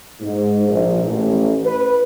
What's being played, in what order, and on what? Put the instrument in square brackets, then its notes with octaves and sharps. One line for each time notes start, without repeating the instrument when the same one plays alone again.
[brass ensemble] G#2
A#1
A1
B4